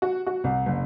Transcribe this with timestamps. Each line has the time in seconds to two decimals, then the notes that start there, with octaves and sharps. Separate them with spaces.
0.02 F#4
0.26 F#4
0.44 C2
0.66 F#1